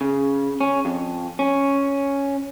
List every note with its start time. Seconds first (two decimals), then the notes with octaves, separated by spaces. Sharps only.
0.01 C#3
0.60 C#4
0.85 F2
1.39 C#4